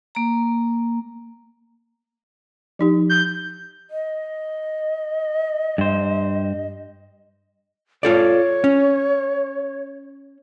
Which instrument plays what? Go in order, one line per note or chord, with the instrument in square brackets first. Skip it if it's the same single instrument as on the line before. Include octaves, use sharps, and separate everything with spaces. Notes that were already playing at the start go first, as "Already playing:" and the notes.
[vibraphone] A#3 A#5
[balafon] F3 D#4 G4
[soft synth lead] G6
[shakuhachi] D#5
[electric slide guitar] G2 C5
[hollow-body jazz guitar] F4 A4 D5 [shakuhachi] C#5
[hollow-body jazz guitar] C#4